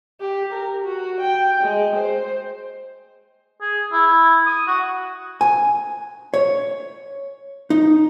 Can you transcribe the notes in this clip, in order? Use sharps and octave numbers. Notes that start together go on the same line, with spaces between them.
G4
A#4
F#4
G5
G#3
C5
G#4
E4
D#6
F#4
G#5
C#5
D#4